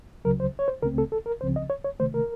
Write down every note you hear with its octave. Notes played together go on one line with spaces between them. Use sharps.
C#2 C#3 F#3 A#4
C5
C#5
C5
C#2 C#3 A3 C4 A#4
A4
A4
A#4
C#2 C#3 F3 C4 C5
D#5
C#5
C#5
C3 D#3 A3 C5
A#4